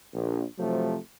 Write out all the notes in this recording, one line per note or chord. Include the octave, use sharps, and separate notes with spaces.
A#1
C3 F3 F#3 A3